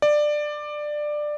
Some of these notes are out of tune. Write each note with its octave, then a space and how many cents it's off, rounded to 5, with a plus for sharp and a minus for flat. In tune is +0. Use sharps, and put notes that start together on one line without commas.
D5 +15